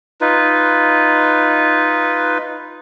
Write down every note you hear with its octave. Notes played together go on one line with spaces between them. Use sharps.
D#4 F4 B4